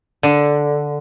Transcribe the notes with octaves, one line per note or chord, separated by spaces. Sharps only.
D3